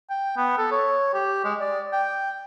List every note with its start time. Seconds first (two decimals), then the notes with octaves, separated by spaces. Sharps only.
0.10 G5
0.37 B3
0.58 A4
0.72 C#5
1.14 G4
1.45 G#3
1.60 D5
1.93 G5